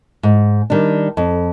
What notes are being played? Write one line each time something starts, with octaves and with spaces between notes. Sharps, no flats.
G#2
D#3 G3 D4
F2